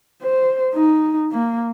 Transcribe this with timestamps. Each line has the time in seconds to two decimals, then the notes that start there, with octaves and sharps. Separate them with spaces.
0.23 C5
0.75 D#4
1.32 A#3